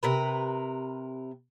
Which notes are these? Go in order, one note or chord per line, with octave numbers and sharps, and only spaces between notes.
C3 A#4 B4